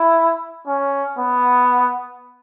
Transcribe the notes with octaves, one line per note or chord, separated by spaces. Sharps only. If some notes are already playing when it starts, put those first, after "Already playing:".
Already playing: E4
C#4
B3